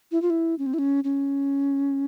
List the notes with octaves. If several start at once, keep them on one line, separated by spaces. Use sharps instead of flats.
E4
F4
E4
C#4
C4
E4
C#4
C#4